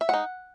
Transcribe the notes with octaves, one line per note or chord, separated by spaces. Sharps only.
E5
G#3 D#4 F#5